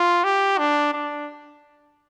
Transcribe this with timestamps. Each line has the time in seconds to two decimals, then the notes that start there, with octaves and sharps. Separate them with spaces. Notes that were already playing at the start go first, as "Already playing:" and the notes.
Already playing: F4
0.24 G4
0.58 D4
0.93 D4